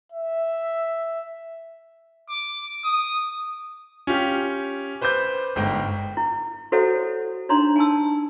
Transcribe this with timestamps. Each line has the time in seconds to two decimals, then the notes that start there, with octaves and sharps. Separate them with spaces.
0.12 E5
2.30 D6
2.85 D#6
4.07 C#4 F4 G4
5.01 B4 C5 B5 D6 G6
5.56 G1 G#2 G5
6.17 E4
6.72 E4 F#4 A4 C5 C#5 F#5
7.49 D4 D#4 C#5 A#5 C6
7.76 G#5 A5 E6